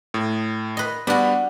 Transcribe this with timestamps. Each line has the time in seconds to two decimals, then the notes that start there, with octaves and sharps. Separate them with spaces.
0.14 A2
0.77 B4 D#5
1.07 G3 B3 D4 F#4